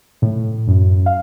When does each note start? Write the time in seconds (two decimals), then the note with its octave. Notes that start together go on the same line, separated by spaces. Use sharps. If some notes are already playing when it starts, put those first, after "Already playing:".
0.22 A2
0.68 F#2
1.06 F5